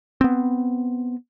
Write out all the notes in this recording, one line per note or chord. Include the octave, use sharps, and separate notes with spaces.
B3 C4